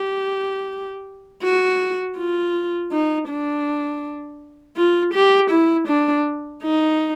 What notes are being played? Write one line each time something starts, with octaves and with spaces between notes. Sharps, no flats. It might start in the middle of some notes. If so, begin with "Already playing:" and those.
Already playing: G4
F#4
F4
D#4
D4
F4
G4
E4
D4
D#4